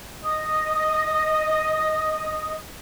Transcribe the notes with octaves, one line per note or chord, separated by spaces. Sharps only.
D#5 D#6